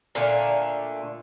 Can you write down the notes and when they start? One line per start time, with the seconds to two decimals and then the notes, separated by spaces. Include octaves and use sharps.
0.15 A#2 D3 A3 F5